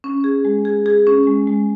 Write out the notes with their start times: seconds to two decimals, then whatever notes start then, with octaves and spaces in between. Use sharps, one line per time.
0.04 C#4
0.24 G#4
0.45 G#3
0.65 G#4
0.86 G#4
1.07 C#4
1.27 G#3
1.47 G#3